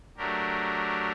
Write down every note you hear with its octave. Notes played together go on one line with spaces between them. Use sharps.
F#3 A3 D4 G4 A#4